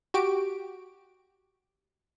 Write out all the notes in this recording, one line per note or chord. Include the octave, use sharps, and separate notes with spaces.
F#4 G4 D7